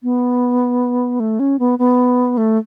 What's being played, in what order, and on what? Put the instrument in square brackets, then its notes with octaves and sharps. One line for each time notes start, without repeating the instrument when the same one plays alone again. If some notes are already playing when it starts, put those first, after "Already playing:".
[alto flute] B3
A3
C#4
B3
B3
A3